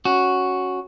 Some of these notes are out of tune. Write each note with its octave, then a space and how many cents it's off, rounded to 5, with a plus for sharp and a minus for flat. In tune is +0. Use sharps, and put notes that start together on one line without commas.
C#4 +0 F#4 +0